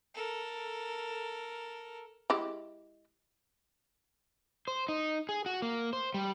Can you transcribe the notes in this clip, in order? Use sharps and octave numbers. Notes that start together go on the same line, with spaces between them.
A4 A#4
G#3 E4 G4
C5
D#4
G#4
F#4
A#3
C5
G3